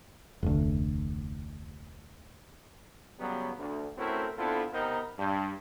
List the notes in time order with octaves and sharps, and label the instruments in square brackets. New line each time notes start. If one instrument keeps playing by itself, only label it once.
[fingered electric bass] F1 D2
[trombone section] C#3 F#3 G3 B3
D2
A3 C4 C#4 E4 F#4 A#4
B3 C4 D4 E4 F4 A4
C3 B3 C4 D#4 A#4
G2